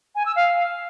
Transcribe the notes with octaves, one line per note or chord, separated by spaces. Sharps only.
G#5
E6
F5